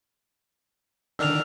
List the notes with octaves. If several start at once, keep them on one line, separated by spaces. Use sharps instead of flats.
D3 D#3 D4 E6 F6 F7